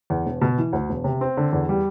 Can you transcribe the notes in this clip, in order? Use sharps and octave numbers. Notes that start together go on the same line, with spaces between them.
E2
E1
B2
E3
D2
E1
C3
C4
D3
E2
G3